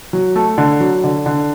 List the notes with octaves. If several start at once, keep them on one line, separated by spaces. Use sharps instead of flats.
F#3
A3
D3
F#3
D3
D3